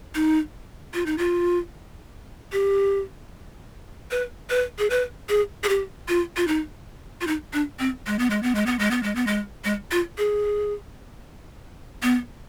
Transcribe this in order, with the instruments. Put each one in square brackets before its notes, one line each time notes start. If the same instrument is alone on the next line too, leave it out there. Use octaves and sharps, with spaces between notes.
[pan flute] D#4
F4
D#4
F4
G4
B4
B4
G#4
B4
G#4
G#4
G4
F4
F4
D#4
F4
D#4
D4
C4
G#3
B3
G#3
B3
G#3
B3
G#3
B3
G#3
B3
G#3
G#3
F4
G#4
B3